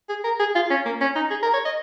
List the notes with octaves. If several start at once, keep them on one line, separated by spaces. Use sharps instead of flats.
G#4
A#4
G#4
F4
C#4
A#3
C#4
D#4
G#4
A#4
C#5
D#5